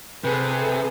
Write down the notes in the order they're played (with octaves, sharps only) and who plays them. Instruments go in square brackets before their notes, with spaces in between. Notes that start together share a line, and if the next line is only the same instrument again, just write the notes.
[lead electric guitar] C3 [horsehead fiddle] G#4 A4 [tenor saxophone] B4